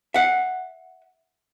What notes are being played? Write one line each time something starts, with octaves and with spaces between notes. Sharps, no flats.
E5 F#5